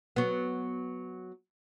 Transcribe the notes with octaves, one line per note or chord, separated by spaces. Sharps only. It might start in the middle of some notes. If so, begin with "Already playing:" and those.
F#3 B3